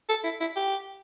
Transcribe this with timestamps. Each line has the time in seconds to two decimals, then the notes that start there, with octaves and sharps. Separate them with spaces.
0.09 A4
0.24 E4
0.41 E4
0.56 G4